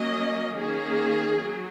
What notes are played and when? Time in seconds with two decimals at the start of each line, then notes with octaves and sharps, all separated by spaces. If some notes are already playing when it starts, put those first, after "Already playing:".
Already playing: F#3 A#3 C#4 D#5
0.57 D#3 A#3 C#4 G#4
1.40 F#3